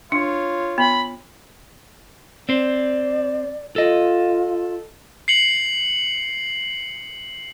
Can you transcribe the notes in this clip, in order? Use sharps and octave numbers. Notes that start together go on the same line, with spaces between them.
D4 F4 C#5
B3 B5
C4 C5 D5
F4 A4 D#5
C7 C#7 F#7